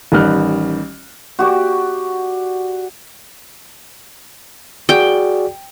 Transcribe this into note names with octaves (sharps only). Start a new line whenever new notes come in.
A1 D#3 G3 F6 F#6
F#4 G4 D5
F#4 G#4 D5 G5